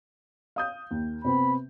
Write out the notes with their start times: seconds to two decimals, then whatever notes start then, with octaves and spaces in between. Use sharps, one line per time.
0.56 F5 D#6 G6
0.91 D#2
1.24 C3 B3 C4 B5